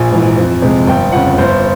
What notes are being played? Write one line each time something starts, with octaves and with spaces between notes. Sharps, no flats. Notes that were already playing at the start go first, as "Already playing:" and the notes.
Already playing: A#1 G#5
G#2 E3
F2
C3 F3 G#3
G1 G5
F2 C#3 F#5
G1 C5